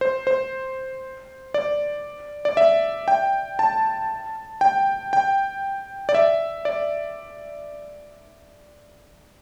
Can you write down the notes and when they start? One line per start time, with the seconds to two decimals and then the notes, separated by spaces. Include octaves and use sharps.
0.01 C5
0.27 C5
1.54 D5
2.45 D5
2.57 E5
3.08 G5
3.59 A5
4.61 G5
5.13 G5
6.09 D5
6.15 E5
6.65 D5